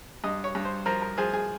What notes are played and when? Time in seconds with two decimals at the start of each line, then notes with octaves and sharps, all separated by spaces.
0.24 G2 D#5
0.44 C#5
0.55 G2
0.65 C5
0.86 F3 A#4
1.02 A#4
1.17 F3 G#4
1.34 G#4